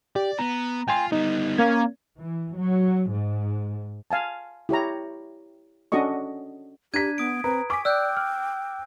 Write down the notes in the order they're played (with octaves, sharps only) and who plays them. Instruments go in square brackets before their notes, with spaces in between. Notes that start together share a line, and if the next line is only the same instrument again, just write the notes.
[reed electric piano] G4 [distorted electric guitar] D5
[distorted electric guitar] B3 [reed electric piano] A#5
[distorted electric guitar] F4 [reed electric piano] G5 G#5 C6
[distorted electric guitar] G3 B3 [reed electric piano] D#4
[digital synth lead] A#3 [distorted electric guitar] C#4 [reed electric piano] G#6
[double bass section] E3
F#3
G#2
[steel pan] F5 G#5 A5
E4 G4 C#5 A#5
C#4 D4 F#4 A4 D#5 C#6
[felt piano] D4 A#5 B6 [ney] G4 [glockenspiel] G#6 D#7
[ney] B3 [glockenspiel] D#6 D7
[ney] C4 [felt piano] B4 [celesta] A#5
[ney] G#5 [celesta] C#6 B6 [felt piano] D6
[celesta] D5 [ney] G5 [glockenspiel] E6 F#6 G6
[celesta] F6